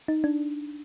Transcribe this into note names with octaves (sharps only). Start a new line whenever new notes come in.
D#4
D4